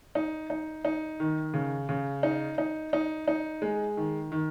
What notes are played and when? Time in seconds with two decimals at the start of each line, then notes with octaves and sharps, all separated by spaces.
0.15 D#4
0.50 D#4
0.85 D#4
1.20 D#3
1.54 C#3
1.89 C#3
2.23 D#4
2.58 D#4
2.93 D#4
3.28 D#4
3.62 G#3
3.97 D#3
4.32 D#3